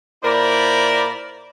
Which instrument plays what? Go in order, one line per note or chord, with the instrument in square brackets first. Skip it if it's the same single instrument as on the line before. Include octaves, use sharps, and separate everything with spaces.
[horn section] A#2 E4 A#4 C5 D5 B5